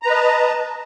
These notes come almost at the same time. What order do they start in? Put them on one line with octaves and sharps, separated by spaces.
A#5 B4 D#5 A5